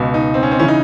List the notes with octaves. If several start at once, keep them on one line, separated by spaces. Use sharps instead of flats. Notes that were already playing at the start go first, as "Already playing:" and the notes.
Already playing: C#2 B2
D#4
C4
C#4
C4
C#3 E3 C#4
D#4